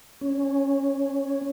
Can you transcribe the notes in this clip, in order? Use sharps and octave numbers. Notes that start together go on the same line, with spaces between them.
C#4